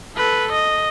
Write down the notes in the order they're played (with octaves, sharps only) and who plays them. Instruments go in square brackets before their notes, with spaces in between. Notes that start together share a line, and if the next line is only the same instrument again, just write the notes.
[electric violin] A4 B4
D#5